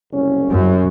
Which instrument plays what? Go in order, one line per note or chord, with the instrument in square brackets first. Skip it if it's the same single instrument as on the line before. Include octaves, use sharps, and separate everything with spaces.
[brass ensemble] F#1 C2 C#4
[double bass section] F#2